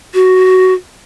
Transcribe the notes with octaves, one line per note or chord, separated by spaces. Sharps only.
F#4